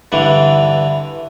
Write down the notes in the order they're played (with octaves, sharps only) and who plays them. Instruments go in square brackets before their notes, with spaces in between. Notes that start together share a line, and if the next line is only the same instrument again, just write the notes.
[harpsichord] G2 D3 E3